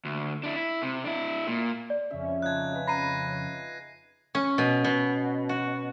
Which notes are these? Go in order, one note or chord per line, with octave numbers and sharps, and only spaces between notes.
D2
D4 E4
E4
C3
D4 E4
A#2
D5
F2 C#3 C#4 E5
D#4 F4 A5 F#6 G#6
G#3 B4
A#5 B5 A#6 C7 D#7
C#4
B2
B2
F#4